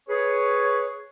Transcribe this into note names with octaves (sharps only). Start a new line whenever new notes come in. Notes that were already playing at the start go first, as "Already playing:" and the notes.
G#4 B4 C#5